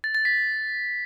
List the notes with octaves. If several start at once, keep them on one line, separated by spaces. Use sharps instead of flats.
A6
A6
B6